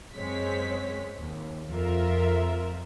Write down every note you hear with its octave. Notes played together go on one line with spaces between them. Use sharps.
F#2 G#3 C4 C#5 B6
D#2
F2 F4 A#4 E5